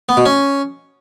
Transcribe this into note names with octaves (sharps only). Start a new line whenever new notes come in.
B3
B2
C#4